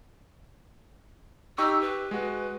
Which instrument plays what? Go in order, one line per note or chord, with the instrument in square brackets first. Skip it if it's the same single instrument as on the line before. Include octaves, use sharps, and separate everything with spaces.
[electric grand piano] D#4 G4 C#6 [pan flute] E6
[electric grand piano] G4 [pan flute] B4
[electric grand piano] G#3 F#4